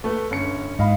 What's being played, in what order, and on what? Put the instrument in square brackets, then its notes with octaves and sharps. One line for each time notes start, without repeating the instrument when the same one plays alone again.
[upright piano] A3 B4
G1 C#4 C#7
[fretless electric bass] G#2 [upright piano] D#5 F5 B5